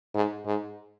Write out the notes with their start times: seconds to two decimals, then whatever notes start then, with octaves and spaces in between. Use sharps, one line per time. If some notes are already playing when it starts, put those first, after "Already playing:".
0.14 G#2
0.45 G#2